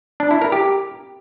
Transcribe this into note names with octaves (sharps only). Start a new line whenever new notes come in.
D4
E4
A#4
G4